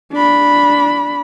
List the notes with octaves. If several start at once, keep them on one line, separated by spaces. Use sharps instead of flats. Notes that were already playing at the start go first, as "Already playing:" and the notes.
D4 B5